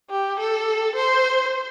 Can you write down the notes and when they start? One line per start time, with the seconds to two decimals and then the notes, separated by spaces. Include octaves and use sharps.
0.11 G4
0.40 A4
0.96 C5